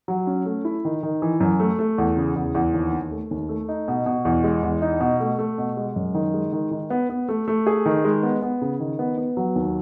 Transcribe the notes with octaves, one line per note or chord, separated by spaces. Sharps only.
F#3
C#4
A3
E4
D#3
D#3
E3
F#2
A3
A3
E2
C#3
E2
E2
D#2
D#2
A3
D#2
A3
D#4
B2
B2
E2
G#3
E2
D#4
B2
A3
A3
B2
G#3
F#2
D#3
G#3
D#3
D#3
B3
B3
A3
A3
G#4
D#3
G#3
B3
B3
C#3
D#3
B3
B3
F#3
D#2